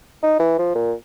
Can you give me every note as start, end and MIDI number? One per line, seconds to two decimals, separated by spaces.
0.23 0.34 63
0.39 0.58 52
0.58 0.73 53
0.75 0.92 46